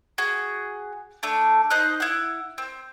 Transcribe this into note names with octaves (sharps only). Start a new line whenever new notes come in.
F#4 G#4
A3 D4
D#4 C5 D#5 F#6
E4 F#5
C4